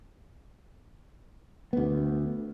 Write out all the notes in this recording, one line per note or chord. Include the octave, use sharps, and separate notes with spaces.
D2 B3